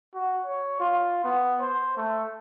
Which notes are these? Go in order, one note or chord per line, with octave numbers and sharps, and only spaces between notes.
F#4
C#5
F4
B3
C5
A3